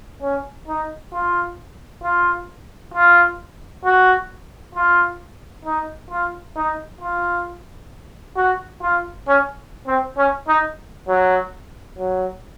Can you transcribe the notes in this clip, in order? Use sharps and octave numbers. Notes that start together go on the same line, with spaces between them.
C#4
D#4
F4
F4
F4
F#4
F4
D#4
F4
D#4
F4
F#4
F4
C#4
C4
C#4
D#4
F#3
F#3